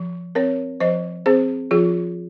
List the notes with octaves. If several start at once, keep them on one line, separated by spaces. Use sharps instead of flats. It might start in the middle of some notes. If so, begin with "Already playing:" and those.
Already playing: F3
C4 A#4 C#5
F3 C5 D#5
C4 G#4 C5
F3 F4 G#4